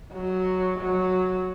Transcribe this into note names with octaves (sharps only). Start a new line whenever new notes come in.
F#3
F#3